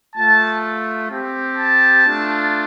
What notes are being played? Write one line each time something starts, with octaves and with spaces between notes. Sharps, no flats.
A3 F4 A5
C4 G4
A5
A3 D4 F4